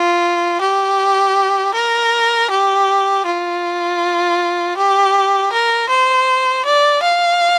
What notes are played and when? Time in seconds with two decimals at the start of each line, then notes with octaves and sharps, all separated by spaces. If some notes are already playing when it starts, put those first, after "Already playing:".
Already playing: F4
0.61 G4
1.74 A#4
2.51 G4
3.26 F4
4.77 G4
5.53 A#4
5.89 C5
6.66 D5
7.03 F5